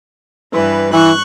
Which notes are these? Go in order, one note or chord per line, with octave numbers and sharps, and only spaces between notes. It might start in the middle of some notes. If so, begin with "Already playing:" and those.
G2 E3 B4
E3 C#6 F#6